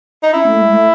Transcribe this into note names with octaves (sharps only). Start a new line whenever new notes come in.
D#4
C#4 E4
A3
G#3
A3